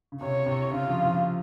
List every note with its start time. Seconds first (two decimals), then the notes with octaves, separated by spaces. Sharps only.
0.12 C#3
0.21 C3 C#5
0.46 C3
0.72 C#3 F4
0.90 F3
1.06 F3